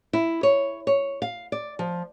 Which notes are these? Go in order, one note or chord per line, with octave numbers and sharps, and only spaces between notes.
E4
C#5
C#5
F5
D5
F3